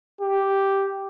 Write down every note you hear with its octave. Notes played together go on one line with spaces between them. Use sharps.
G4